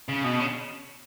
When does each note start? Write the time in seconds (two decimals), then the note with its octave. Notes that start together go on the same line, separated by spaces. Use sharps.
0.09 C#3
0.24 B2
0.40 C#3